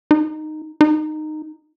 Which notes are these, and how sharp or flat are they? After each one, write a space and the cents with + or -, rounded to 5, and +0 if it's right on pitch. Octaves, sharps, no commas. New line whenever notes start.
D#4 -10
D#4 -15